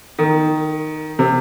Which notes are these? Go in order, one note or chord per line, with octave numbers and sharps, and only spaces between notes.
D#3
C3